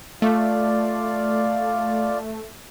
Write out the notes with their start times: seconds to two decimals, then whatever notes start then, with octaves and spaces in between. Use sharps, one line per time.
0.22 A3 F4 D5 F5